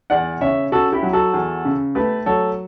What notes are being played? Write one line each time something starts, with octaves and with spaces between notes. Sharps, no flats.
E2 D5 F#5
C#3 C#5 E5
C#4 F#4 A4
E4 G4
F#3
F#4 A4
E2
C#3
A3 G4 B4
F#3 A4 C#5